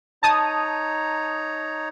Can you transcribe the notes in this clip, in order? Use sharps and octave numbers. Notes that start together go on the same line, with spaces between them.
D#4 C#5 A5 A#5 D#6